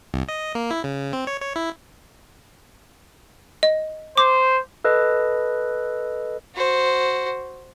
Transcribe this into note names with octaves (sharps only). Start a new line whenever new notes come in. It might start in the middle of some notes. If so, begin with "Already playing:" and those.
C2
D#5
A#3
E4
C#3
C4
C#5
C#5
E4
D#5
C5 D6
A4 B4 D#5
F#4 C5